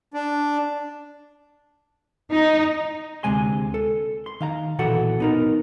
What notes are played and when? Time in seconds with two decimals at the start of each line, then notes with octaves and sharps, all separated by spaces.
0.14 D4
2.31 D#4
3.23 D2 C3 G#3 G#5 C6
3.74 A4
4.26 C6
4.41 D#3 F5 A#5
4.79 B1 A#2 E3 F#4 A4 F#5
5.20 B3 D#4 A#4